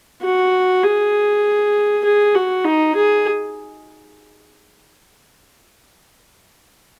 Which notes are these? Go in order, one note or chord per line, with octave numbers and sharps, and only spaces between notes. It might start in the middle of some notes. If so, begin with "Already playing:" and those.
F#4
G#4
G#4
F#4
D#4
G#4